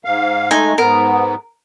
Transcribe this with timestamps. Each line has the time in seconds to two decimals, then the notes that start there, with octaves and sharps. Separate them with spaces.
0.05 G#2 F5
0.51 G#3 A3 D#4 G#5
0.78 G#2 B3 A#4